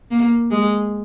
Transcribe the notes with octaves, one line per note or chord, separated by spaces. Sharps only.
A#3
G#3